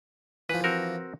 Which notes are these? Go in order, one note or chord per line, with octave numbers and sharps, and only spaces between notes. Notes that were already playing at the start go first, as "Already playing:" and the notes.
E3 F3 B4
C4 F#4 A#4